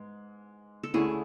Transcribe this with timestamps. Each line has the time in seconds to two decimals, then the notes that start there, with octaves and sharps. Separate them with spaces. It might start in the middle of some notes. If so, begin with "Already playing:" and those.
Already playing: G#2 G#3 B3
0.83 A4
0.94 D2 D3 A3 C#4 E4 G#4